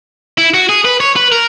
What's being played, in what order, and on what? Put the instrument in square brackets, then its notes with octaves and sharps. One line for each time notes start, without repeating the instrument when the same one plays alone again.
[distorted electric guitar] E4
F#4
G#4
B4
C#5
B4
A#4